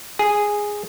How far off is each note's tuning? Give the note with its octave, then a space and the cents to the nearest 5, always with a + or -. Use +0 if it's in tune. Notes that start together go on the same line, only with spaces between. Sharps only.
G#4 -5